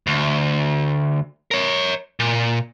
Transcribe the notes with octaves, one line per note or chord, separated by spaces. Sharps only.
D2
A#4 C#5
A#2